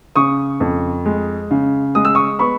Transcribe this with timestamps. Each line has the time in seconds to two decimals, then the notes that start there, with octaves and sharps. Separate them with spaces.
0.16 C#3 C#6 D#6
0.60 F2
1.06 G#3
1.51 C#3
1.95 G#3 D#6
2.05 E6
2.15 C#6 D#6
2.39 B3 B5 C#6